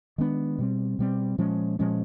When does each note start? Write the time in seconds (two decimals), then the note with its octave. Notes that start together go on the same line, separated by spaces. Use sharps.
0.18 D#3 G#3 B3 D4
0.58 B2 G3 C4
0.99 B2 G3 C4
1.38 A#2 F3 G#3 C#4
1.79 A#2 F3 G#3 C#4